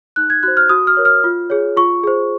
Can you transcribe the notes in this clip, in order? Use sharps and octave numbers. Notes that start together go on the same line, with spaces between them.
D#4 F#6
G#6
F#4 C5 F#6
F6
F#4 D#6
F6
A#4 C#5
F6
F4
G#4 C#5
F4 C#6
G#4 C5